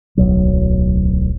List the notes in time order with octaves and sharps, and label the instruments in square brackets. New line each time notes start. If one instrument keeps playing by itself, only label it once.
[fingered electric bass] D1 B1 F#3